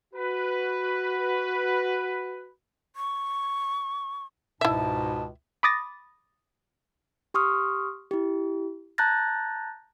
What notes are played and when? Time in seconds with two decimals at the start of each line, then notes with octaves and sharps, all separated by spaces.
0.14 F#4 B4
2.96 C#6
4.61 C#2 G#2 B2 E4 E5 A5
5.63 B5 D6 D#6 A6 A#6
7.34 G4 C6 C#6 D#6 F6
8.11 E4 G4
8.98 A5 A#5 F#6 G6 A6 A#6